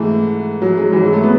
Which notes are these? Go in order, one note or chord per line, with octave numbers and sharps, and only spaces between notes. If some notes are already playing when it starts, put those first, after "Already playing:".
Already playing: G#2 E3 G#3 A3
F#3
G#3
G#2 E3 F#3
G#3
F#3 A3
B3